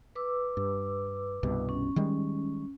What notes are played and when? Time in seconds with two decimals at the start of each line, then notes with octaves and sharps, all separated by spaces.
0.15 B4 D6 E6
0.57 G2
1.43 C2 G2 B2
1.69 C#4
1.96 D#3 G3 G#3